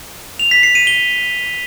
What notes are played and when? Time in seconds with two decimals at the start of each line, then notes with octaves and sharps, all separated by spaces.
0.39 F7
0.51 B6
0.63 C7
0.75 D#7
0.87 G7